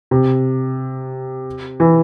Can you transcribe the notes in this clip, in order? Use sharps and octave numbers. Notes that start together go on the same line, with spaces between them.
C3
E3